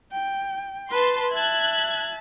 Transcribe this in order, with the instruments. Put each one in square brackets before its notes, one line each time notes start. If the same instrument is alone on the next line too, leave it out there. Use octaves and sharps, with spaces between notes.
[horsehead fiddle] G5
[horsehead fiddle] B4 [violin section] A5 C6
[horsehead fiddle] E5 A5 [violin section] F#6 G#6